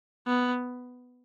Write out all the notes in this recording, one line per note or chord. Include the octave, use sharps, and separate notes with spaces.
B3